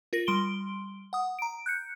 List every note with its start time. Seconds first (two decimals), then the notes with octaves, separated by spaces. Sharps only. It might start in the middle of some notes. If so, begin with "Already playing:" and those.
0.13 F4 A#4 A#6
0.27 G3 C6 D7 G7
1.13 F#5 D#6
1.39 A#5 D7
1.66 F#6 G6 C#7